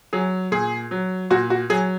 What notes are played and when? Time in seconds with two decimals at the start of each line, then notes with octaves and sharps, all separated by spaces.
0.13 F#3 G#4
0.52 A#2 G#4
0.91 F#3
1.30 A#2 F#4
1.50 F#4
1.70 F#3 G#4